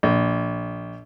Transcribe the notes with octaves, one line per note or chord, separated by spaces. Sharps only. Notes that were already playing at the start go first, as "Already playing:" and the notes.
A#1